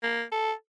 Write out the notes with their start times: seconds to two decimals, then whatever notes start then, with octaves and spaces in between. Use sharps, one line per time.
0.03 A#3
0.32 A4